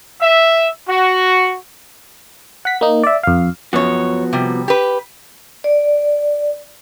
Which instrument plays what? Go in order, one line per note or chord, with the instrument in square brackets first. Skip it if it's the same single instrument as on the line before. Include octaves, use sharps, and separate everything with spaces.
[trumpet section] E5
F#4
[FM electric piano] F#5 B6
A#3 D#4
D5 E5
F2 F5
[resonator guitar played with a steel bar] F#2 C#5 [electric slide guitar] F3 B3 F#4
[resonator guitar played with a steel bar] C3 G3
G4 B4
[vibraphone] D5